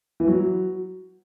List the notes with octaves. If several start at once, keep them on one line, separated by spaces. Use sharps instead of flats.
E3
F#3